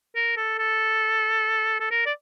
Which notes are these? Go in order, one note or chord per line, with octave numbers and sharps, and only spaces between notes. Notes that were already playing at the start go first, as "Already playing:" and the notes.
A#4
A4
A4
A4
A#4
D5